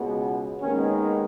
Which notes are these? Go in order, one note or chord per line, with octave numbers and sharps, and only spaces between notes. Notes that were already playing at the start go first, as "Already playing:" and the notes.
Already playing: C#2 B2 G#3 B3
D#2 D#3 G#3 B3 C#4